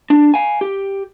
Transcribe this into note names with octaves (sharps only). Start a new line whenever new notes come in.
D4
F5 G#5
G4